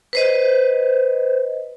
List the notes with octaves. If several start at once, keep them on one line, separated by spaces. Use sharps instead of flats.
B4 C5 D#5